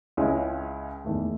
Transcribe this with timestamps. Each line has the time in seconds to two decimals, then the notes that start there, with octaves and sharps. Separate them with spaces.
0.17 C#2 C#3 G#3 C#4 E4
1.05 F#1 E2 D#3 A3